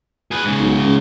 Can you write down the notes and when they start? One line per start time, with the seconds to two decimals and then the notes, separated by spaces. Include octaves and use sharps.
0.31 G#4 B4
0.44 G#2 C#3
0.60 B1
0.84 C#2